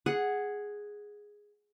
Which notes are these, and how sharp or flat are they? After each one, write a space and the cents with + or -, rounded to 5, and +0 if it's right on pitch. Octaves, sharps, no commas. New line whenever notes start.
G#4 +0 F#5 +0